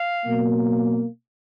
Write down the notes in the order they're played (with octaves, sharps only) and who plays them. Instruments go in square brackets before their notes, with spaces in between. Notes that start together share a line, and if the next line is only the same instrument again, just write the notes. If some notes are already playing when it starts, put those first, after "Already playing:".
Already playing: [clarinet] F5
[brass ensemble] B2 F#3 A#3